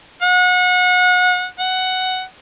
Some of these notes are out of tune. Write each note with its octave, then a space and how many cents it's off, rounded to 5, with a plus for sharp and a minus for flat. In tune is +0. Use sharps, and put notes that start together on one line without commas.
F#5 -30
F#5 +10